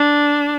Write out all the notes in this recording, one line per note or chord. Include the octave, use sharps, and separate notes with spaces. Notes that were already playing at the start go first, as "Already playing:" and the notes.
Already playing: D4